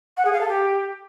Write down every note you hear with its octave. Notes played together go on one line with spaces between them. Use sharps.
F#5
G#4
F5
A4
G4